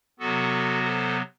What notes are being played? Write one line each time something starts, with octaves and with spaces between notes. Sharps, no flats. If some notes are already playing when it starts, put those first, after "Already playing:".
C3 F#3 B3 F#4 A4
A4 C5